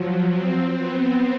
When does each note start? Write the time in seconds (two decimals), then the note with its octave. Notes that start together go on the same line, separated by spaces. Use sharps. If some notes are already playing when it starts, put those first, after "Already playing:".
Already playing: F3 F#3
0.30 C4
0.74 B3